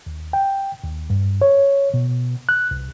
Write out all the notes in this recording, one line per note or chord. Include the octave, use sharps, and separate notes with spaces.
D#2
G5
D#2
G2
C#5
B2
F#6
C2